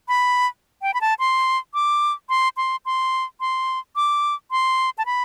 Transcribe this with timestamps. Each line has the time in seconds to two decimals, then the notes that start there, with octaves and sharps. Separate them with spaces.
0.08 B5
0.82 G5
0.94 B5
1.01 A5
1.19 C6
1.74 D6
2.29 C6
2.57 C6
2.85 C6
3.40 C6
3.96 D6
4.51 C6
4.98 A5
5.06 B5